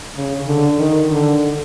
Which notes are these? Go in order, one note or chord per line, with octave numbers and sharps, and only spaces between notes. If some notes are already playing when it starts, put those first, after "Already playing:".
C#3
D3
D#3
D3